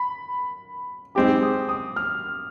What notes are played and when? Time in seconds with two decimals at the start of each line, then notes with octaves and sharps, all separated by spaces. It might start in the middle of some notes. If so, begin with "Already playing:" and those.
Already playing: B5
1.15 G#3 C4 G4 D6
1.43 D#6
1.69 D#6
1.96 F6